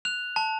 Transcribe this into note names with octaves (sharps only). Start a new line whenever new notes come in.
F#6 F7
A5